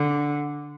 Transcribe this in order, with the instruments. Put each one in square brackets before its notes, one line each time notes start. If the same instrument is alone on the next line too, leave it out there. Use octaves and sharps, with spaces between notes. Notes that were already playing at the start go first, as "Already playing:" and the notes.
Already playing: [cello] D3